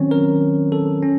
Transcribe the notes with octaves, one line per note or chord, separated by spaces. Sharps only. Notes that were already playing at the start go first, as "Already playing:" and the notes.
Already playing: D#3 F#3 C4 C#4 C#5
A#4
A4
C#4